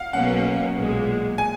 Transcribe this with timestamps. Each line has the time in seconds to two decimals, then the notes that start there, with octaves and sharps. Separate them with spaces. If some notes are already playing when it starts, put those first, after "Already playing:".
Already playing: F5 F#5
0.13 B1 B2 F#3 A#3 C#4 F#5
0.76 B1 A#2 G#3
1.38 G#5